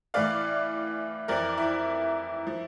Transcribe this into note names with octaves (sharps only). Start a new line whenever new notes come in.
A2 E3 D5 F5
F2 E3 A#4 D5
E4
F3